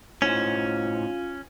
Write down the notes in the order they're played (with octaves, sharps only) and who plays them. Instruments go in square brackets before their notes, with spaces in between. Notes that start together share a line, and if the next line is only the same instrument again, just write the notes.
[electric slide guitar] A2 D#4 C5 [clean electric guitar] C#4 [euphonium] F4